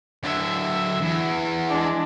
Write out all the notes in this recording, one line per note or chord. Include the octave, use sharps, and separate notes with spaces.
D3 F#3 E5
E2
G#3 D4